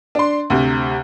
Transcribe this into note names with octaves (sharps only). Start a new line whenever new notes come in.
D4 C6
D2 C3